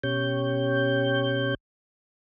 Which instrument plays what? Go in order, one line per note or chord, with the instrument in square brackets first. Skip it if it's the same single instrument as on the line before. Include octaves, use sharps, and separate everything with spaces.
[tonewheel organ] B2 C#4 G4 C#5 G6